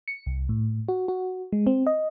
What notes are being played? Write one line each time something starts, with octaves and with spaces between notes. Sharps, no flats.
C#7
C2
A2
F#4
F#4
G#3
C4
D#5